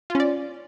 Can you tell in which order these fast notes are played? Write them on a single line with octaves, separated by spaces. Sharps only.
F4 C#4 D5